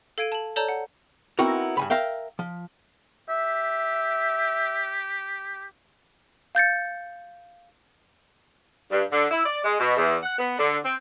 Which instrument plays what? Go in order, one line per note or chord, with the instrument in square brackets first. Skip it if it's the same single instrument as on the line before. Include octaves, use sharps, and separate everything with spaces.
[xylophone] A4 F5 G#6 D7 D#7
A5 F#7
A4 C#5 D5 A5 A#5 G6
F#5
[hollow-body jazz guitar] B3 C4 D#4 E4 F#4 A#4
G2 G#5 B5
A#4 E5 F5 G5
F3
[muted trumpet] G4 [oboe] E5
[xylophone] F5 G6 A6 C#7
[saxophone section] G2
D3
E4
D5
G#3
B2
E2
F#5
B3
D3
C4